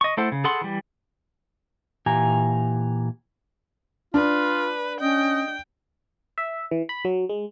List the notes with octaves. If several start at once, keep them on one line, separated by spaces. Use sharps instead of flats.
D#5 C#6
A3 E4 A4 C5 F#5
C#3
G#4 A4 F#5 B5 C6
E3 G3
A#2 E3 G4 G#5 A#5
D4 F4 B4
C#4 D#5 G5
E5
E3
B5
F#3
G#3